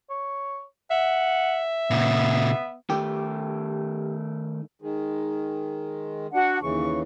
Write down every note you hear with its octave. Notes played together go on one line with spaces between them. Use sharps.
C#5
E5 F#5
A#2 C#3 B3
D#3 A3 G4
D#3 G#3
D4 F#4 F#5
D#2 C#3 E3 C#6